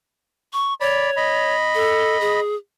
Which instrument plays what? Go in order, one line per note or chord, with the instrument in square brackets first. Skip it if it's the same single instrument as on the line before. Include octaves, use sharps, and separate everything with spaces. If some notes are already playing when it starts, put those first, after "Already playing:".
[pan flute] C#6
[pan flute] C#5 [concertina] D5 B5
[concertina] D#5 B5
[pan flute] A4
G#4